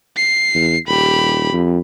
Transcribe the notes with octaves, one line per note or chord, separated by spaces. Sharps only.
C7
E2
D#1 G4 B5
F2